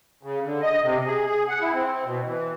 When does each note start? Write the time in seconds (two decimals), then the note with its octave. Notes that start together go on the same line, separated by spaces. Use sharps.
0.23 C#3
0.43 D3
0.62 D#5
0.83 C3
1.06 G#4
1.26 G#4
1.48 F#5
1.62 E4
1.74 C4
2.05 B2
2.25 E3